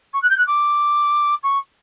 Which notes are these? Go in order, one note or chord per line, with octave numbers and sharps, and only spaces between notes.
C#6
F#6
G6
F#6
D6
C#6